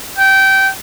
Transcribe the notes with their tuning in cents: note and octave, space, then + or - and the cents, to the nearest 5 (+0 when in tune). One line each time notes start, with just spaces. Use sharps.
G5 -20